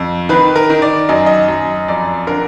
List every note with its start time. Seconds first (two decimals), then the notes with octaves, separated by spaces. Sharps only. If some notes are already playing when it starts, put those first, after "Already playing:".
Already playing: F2
0.29 D#3 B4
0.56 A#4
0.70 D#3
0.82 D5
1.09 F#2 D#5
1.26 D#5
1.48 F#2
1.88 F2 D5
2.27 D3 A#4